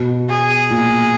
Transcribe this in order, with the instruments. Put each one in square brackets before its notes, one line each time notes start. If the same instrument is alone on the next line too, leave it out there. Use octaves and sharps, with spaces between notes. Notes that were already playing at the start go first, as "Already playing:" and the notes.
Already playing: [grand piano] B2
[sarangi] G#4
[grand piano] A#2